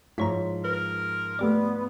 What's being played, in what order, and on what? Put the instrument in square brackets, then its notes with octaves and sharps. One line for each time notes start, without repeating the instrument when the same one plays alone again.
[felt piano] G#2 F3 B6 [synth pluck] E4 C#5 A#5
[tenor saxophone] A#4 [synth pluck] B4
[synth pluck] A3 G4 D5 [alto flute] B3